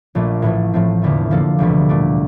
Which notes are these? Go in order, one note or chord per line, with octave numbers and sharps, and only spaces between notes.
A#1 A#2 A3
A1 A2 E3 A3
A2 F3 A3 C4
F1 E2 D3 A3
D3 F3 A#3 F4 A4
E1 D2 C3 E3 G3
A#2 A3 D4